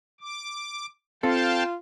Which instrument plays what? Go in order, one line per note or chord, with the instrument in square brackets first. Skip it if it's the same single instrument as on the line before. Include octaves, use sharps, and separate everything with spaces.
[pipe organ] D6
[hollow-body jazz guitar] C4 A4 [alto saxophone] F4 [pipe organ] F5 G5 A5